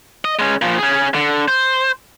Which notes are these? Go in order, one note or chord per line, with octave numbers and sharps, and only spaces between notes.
D#5
G#3 C#4
A#2 F3
C#4 G#4
D3
C5